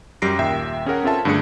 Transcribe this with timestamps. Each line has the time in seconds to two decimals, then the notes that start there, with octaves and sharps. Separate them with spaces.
0.22 F#2 G3 G4 A#6 C7 D7
0.39 D#2 A#2 E5 G5
0.86 C#4 G#4 A#4 F#5
1.03 C4 C#4 F4 A4 E5 A5
1.25 G2 D3 A3 D4 G#4 C#7